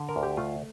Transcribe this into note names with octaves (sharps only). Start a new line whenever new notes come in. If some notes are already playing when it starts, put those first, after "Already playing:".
Already playing: D3
A#4
D2
G4
A3 F4